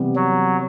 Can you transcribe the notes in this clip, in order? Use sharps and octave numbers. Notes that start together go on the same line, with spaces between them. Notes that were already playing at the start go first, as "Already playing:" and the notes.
Already playing: C3 E3 G3 B3
F#3